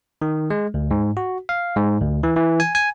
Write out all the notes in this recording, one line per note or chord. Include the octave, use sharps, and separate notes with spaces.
D#3
G#3
D2
G#2
F#4
F5
G#2
D2
E3
E3
G#5
G#5